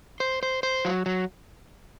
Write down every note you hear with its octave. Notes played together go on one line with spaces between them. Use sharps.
C5
C5
C5
F#3
F#3